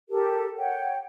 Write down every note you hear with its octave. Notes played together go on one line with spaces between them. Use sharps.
G4 A4 A#4
C#5 F#5 G5